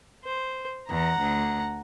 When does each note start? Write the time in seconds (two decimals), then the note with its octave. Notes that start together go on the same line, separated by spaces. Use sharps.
0.24 C5
0.89 E2 F#5 A#5
1.19 D2